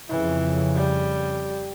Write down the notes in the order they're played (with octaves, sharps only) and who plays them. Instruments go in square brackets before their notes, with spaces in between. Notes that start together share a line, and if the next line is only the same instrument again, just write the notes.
[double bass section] F2 C#3 [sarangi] E3
[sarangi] G3